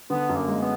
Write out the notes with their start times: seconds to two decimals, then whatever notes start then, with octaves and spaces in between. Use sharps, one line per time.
0.10 D3 B3
0.29 F#2
0.35 A#3
0.48 G#3
0.61 B3